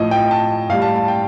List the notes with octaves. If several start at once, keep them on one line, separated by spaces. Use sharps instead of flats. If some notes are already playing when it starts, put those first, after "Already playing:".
Already playing: A2 F3 D#5
G5
A5
A2 G3 F5
A5
A5
G5